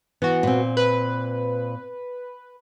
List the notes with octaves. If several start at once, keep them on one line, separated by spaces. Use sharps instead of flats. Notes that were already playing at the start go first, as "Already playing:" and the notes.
E3 B3 F#4
A#2 C4
B4